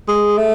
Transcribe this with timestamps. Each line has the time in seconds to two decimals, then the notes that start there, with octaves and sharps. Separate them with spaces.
0.08 G#3
0.37 A3